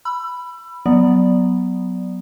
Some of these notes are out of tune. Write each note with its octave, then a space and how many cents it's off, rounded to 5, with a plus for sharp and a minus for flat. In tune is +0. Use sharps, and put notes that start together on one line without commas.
B5 +0 E6 +30
F#3 +0 B3 +0 D5 +0